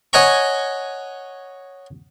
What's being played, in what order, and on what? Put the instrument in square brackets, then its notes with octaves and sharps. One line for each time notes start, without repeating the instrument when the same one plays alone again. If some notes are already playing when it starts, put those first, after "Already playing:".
[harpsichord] C#5 D#5 F#5 G#5 A#5 C#6